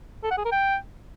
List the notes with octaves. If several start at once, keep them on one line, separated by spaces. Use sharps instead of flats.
A4
F#5
G#4
A#4
G5